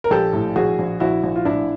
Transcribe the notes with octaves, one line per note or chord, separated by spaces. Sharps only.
A#4
A#1 G4 A4
A2
A#1 F#4 G#4
A#1
A#1 E4 F#4
A#1
F4
A2 D4 E4